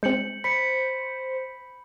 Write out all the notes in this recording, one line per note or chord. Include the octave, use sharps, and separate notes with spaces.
G#3 C4 G6 C#7 F#7
C5 B5 B6 C#7